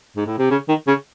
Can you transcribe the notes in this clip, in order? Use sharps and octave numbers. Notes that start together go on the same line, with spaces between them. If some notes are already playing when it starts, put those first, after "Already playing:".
G#2
A2
C3
C#3
D#3
C#3